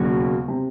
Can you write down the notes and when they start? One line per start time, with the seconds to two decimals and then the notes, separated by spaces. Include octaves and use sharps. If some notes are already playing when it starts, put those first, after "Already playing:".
Already playing: E1 D#2 C#3 F#3 F#4
0.48 C3